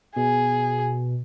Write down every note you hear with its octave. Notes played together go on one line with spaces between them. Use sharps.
B2 G#4